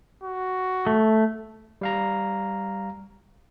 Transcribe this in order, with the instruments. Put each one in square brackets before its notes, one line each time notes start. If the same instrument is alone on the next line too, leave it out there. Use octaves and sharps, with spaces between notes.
[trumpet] F#4
[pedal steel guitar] A3
[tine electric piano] G3 F5 A#5